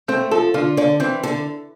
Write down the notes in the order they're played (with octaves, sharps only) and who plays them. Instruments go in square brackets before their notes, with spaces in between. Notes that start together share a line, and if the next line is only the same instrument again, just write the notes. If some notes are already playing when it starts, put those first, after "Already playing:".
[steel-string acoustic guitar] A3 [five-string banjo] C4
[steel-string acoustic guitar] F3 [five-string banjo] A4
[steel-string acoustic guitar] D3 [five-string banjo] F4
[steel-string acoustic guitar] D3 [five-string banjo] D5
[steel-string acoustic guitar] E3 [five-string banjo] C4
[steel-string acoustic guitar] D3 [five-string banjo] A4